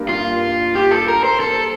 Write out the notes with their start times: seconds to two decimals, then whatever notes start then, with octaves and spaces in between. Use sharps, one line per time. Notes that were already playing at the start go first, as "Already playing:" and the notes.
Already playing: G2 A#3
0.09 F4
0.75 G4
0.91 A4
1.08 A#4
1.24 C5
1.40 A4